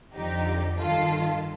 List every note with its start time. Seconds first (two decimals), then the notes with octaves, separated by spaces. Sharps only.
0.14 F2 D3 F3 D#4 G4
0.79 G2 D#3 F4 A4